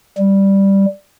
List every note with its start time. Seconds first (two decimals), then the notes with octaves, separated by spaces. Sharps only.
0.18 G3